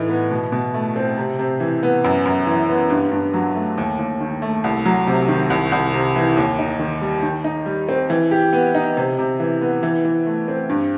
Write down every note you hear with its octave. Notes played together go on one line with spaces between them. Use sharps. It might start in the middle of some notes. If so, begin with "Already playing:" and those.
Already playing: A2 E3 D#4
B3
B2
B2
A3
C4
C3
C3
E3
B3
F#2
F#2
E3
B3
G2
G2
F#3
A3
D#2
D#2
D#3
A3
C2
F#3
C3
D#3
C2
C2
C3
E3
D#2
D#4
D#3
G3
D#3
D#4
G3
C4
E3
G4
B3
D#4
C3
C3
E3
B3
E3
E3
A3
C4
G2